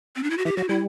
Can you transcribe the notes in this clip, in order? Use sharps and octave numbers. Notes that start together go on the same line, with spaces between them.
C4
D4
E4
F#4
E3 G4
F#3 F#4
G3 E4